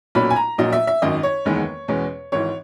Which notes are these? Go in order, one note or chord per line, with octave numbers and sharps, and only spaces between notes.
B1 A#2 F#3 C#4 B5
G#5
A#5
A#1 A#2 F#3 D#5
E5
E5
G#1 F#2 D#3 D#5
C#5
F#1 E2 D#3 G#3 B3
E2 B2 G#3 C#4
G#1 G#2 E3 C#5